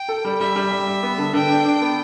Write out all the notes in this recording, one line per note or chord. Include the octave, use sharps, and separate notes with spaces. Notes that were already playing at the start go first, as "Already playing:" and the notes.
Already playing: G5
A4
G3
G3 E5
G3
G3
G3
B3
D3
D3 G5
D4
D4
B3